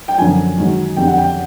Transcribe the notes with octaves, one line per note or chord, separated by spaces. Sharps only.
G5
F#2 D3 F3 G#5
G#2 D#3 F#3
F2 D3 G3 G5
F#5
G5